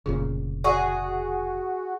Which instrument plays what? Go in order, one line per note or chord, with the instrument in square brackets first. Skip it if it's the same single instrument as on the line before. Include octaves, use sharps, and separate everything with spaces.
[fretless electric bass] F1 A#2 C#3 [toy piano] G#4
[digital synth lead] F#4 [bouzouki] G#4 [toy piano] D5 E5 C#6